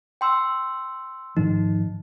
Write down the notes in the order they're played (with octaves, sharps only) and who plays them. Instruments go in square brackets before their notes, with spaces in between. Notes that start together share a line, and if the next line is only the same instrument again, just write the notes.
[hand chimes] G5 C6 E6
[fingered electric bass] G#2 D#3 F3 [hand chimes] D#4